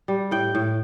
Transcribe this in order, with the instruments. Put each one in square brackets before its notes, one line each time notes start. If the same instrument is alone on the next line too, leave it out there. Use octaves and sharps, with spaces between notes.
[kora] G3
A2 G5
A2